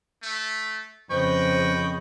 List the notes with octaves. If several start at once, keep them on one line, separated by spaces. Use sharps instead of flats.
A3
F2 C#3 B4 C5 D#5 G5 C#6